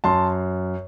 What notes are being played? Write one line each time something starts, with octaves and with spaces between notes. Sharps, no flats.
F#2 A5 C6